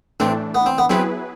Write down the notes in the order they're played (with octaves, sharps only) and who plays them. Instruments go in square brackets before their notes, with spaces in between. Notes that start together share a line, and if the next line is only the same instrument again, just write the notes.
[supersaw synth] A2 E3 A3 D4 [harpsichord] C4
[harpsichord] B3
C4
B3
[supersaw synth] F#3 B3 E4 G#4 B4 [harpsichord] C4